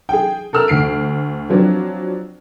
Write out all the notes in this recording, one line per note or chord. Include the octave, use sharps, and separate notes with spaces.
G#4 G5
A4 A#4 E6 F6
D2 C7 D7
F3 F#3 C4 D4